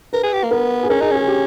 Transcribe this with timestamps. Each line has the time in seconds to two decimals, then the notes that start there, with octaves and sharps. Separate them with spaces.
0.13 A#4 B4
0.23 G#4
0.33 G4
0.43 A#3
0.51 B3 A#4
0.83 G#4
0.90 C#4 A#4
1.01 D#4 G#4
1.11 C#4 G#4
1.27 G4